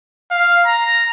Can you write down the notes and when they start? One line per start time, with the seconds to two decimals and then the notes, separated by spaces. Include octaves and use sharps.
0.31 F5
0.66 A#5